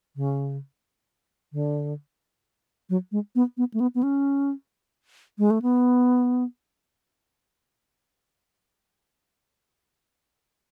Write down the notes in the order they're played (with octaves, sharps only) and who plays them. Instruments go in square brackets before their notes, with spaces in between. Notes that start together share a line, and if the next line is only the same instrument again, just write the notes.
[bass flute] C#3
D3
F#3
G#3
B3
B3
A3
B3
B3
C#4
G#3
A3
B3